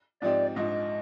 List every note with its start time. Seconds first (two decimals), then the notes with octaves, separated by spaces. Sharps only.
0.22 G#2 F3 C4 D#4 G4 D5
0.56 A#1 G#2 F3 D#5